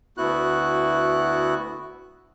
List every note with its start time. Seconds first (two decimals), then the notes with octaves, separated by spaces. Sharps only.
0.18 D2 B3 E4 F#4 F#6